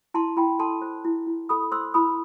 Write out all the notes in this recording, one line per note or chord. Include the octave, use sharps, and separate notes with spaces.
E4 A5 C6
E4 G5 B5
A4 A5 C6
C5
E4
E4
A4 B5 D#6
C5 C6 E6
E4 B5 D#6